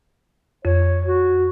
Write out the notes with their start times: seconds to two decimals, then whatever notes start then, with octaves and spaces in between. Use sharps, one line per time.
0.65 F2 C#5
1.06 F#4